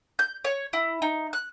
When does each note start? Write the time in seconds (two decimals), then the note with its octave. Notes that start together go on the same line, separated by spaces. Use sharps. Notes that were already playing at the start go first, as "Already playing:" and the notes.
0.19 G6
0.44 C#5
0.73 E4
1.02 D#4
1.33 F#6